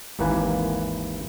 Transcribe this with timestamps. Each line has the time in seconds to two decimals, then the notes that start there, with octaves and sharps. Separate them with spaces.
0.19 G#1 D#2 E3 A#3 B4 G#5